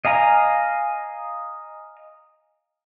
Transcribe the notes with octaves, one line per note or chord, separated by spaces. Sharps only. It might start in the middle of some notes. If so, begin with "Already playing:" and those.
D#5 F5 G#5 A#5